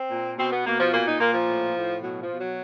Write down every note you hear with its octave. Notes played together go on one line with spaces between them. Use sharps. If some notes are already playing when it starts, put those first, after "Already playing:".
Already playing: C4
A#2
B2 C4
B3
B2 A#3
F3
A#2 A#3
D#4
A#2 A#3
F3
A2
A2
B2 F#3
F3
B2
F#3